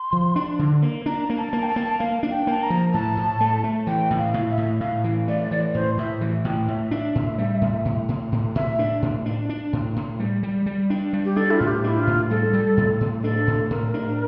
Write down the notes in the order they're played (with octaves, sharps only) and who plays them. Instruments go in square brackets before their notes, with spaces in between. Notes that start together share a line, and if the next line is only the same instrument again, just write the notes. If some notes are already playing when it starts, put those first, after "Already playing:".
Already playing: [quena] C6
[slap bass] F3
D4
D3
A#3
[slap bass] D4 [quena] A#5
[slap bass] A#3
[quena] A5
[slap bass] A#3
[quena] G5
A5
[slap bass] A#3
[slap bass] A#3 [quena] F5
[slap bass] D4
[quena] G5
[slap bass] A#3 [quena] A5
[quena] A#5
[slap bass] F3
[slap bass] A2 [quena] A5
[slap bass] A2
A3
A3
[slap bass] E3 [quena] G5
[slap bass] A2
[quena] F5
[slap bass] A2
[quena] E5
[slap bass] A2
[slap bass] A2 [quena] F5
[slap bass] E3
[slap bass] A3 [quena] D5
[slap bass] E3
[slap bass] A2 [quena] C5
[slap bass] A2 [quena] E5
[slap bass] E3
[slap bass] A2 [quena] G5
[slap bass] A2 [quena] E5
[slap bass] D4
A2
G3
A2
A2
A2
A2
[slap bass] A2 [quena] E5
[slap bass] D4
A2
D4
D4
A2
A2
G3
G3
G3
D4
G3
[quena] G4
[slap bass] D4 [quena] A4
[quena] E4
[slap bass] A2 [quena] F4
[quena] G4
[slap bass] D4 [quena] E4
[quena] F4
[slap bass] A2
[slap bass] G3 [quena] A4
[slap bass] G3
A2
A2
[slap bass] D4 [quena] A4
[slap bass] A2
[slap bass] A2 [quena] A#4
[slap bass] D4